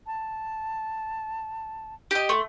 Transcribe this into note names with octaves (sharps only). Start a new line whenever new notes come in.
A5
G4 D#5
A3 C6